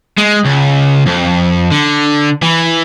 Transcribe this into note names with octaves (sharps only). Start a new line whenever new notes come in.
G#3
C#2
F2
D3
E3